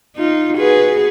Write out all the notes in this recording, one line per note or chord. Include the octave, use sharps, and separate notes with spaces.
D#4 F4
F#4 G#4 B4